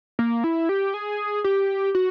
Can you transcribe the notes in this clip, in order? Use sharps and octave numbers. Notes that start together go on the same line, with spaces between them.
A#3
E4
G4
G#4
G4
F#4